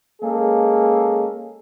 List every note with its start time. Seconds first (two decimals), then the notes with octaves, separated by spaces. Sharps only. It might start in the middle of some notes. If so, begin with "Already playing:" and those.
0.22 G#3 A#3 C#4 G#4 A4